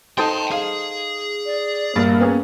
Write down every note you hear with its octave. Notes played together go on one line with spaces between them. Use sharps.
D#4 A4 C5 G5 A5
G#4 F5
D5
A#1 G2 A#3 A6
B3 C#4 G#4